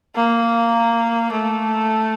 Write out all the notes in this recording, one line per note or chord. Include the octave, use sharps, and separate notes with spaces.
A#3
A3